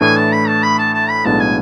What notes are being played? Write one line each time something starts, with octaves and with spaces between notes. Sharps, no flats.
A2 E3 A3 D4 G#5
A5
B5
A5
B5
A5
A5
B5
B1 A2 G#3 B3 D4 A5
G#5